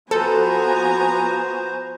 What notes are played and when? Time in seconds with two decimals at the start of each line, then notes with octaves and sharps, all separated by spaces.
0.11 F3 B3 F#4 A4 C5 G#5 A#5